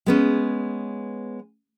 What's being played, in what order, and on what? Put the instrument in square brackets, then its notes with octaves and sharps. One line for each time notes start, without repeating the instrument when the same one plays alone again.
[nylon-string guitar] G#3 B3 C#4